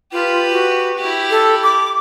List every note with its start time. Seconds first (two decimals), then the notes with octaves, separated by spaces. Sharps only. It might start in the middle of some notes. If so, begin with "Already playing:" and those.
0.12 F4 G4 B4
0.52 F#4
0.98 E4 G4
1.30 A4
1.63 D6